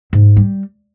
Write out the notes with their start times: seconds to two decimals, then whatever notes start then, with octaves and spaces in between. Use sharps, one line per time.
0.13 G#2
0.36 G3